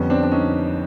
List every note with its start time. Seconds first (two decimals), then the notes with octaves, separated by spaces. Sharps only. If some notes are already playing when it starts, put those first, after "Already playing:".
Already playing: F2 D3 G3 B3 C#4
0.10 C4 D4
0.23 D4
0.31 C#4 D#4